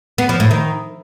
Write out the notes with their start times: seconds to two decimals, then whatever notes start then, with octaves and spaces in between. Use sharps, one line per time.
0.18 B3
0.29 F3
0.40 A2
0.51 D#3